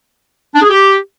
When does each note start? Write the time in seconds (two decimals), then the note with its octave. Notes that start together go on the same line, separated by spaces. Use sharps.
0.55 D4
0.62 G#4
0.69 G4